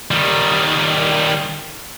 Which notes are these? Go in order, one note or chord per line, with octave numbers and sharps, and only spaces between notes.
D#3 G3